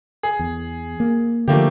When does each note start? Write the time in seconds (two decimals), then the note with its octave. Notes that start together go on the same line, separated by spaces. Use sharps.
0.23 G#4
0.39 E2
1.00 A#3
1.48 D3 E3 F3 A3 A#3 G4